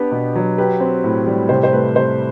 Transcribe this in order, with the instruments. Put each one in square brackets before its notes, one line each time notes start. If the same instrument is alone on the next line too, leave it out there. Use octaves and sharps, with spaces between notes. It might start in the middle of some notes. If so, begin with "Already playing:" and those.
Already playing: [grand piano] B3 D4 [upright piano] G4
[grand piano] B2
F#3
[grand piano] G4 [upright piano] B4
[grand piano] C4
A2
G3
[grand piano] C3 [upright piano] C5
[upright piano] C5
[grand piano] A3 [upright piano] B4
[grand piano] C3 [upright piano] C5